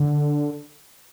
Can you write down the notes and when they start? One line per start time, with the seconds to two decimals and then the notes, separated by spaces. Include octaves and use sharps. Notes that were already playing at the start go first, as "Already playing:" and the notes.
Already playing: D3